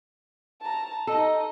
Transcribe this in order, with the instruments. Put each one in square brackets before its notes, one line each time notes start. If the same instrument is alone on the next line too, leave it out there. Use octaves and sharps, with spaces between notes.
[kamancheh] A5 A#5
[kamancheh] D#4 D#5 [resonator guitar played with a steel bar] A4